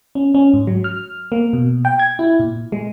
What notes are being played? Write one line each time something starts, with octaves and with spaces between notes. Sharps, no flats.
C#4
C#4
G#2
F#3
F6
A#3
B2
G5
G#6
E4
A#2
G#3